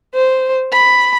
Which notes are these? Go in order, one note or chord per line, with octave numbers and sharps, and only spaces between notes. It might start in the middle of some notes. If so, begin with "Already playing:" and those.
C5
B5